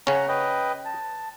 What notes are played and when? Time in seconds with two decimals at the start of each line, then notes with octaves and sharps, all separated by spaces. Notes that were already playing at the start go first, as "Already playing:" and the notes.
0.07 C#3 C#4 F#5 A#5
0.29 B4 D#5 G5
0.85 A5